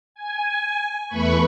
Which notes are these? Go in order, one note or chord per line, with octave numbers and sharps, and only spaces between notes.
G#5
E2 A3 B4 B5 C#6